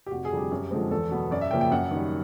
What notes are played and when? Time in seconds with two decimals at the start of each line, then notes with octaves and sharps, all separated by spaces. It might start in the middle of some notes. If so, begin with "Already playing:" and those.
0.06 G4
0.11 F1 F#4
0.25 G#4
0.31 F2 D3 G3
0.37 G4
0.52 F#2
0.70 D3 F3 G#3 C4
0.91 E2 A4
1.11 B2 F#3 B3
1.31 F#2 D5
1.41 E5
1.51 C#3 F3 A#3 G5
1.61 G5
1.71 F#2 F#5
1.91 D#3 G3